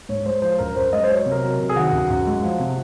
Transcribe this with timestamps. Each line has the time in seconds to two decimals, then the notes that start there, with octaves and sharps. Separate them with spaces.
0.09 G#2 C#5
0.25 G#3 C5
0.42 F3 C5
0.59 F#2 A#4
0.76 F#2 C5
0.93 G#3 D#5
1.03 C5
1.09 F#3 C#5
1.26 C3
1.32 A#4
1.43 F#3
1.60 C3
1.69 G#4
1.76 D#3 F#4
1.92 F#2
2.10 F#2
2.27 G#3
2.43 F3
2.59 C3